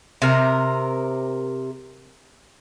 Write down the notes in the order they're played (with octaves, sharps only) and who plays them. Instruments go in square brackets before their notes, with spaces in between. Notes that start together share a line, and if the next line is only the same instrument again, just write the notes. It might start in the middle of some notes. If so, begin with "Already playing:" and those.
[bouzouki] C3 A#4